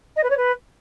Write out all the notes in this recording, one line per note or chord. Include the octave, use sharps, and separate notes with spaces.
D#5
B4
C#5
B4